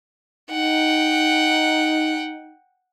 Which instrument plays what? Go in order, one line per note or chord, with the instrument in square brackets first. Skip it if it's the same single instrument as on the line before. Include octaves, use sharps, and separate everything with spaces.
[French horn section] D#4 [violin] F#5 G5